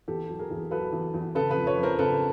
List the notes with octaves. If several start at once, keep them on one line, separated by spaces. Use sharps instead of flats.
E2 G4 A4
F#3
G#4 A#4
E2
F#3 A4 B4
E2
E2
C#3 A4 B4
A4 B4
F2
B4 C#5
F2
A#4 C5
C#3 A4 B4